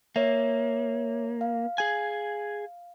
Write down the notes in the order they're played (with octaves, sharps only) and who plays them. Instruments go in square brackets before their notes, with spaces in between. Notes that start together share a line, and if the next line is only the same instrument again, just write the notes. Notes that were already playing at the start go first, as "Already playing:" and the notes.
[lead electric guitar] A#3 [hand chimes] C#5 E5
[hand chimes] F5
[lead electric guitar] G#4 G#5